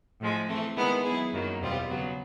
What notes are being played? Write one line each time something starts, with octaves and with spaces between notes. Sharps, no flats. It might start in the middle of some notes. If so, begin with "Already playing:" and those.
A2 F3 G#3
E3 A3 C4
D#3 G#3 B3 E4
F#3 B3 E4 G#4
F#2 D#3 F#3 A#3
E2 B2 G3 C4 F4
C#3 F#3 B3